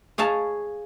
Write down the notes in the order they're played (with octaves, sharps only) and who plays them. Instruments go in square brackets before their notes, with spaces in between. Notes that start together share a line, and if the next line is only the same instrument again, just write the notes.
[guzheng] G#4 C#5 F5 A5